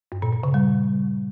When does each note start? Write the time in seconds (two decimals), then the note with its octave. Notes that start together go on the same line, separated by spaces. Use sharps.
0.12 G2
0.22 A#2
0.33 A#2
0.43 C#3
0.54 G3